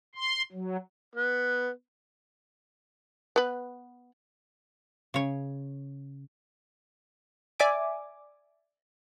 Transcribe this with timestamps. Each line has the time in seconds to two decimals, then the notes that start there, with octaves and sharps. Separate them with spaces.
0.15 C6
0.52 F#3
1.15 B3
3.36 B3 B4
5.14 C#3 C#5
7.59 D5 E5 G#5 D6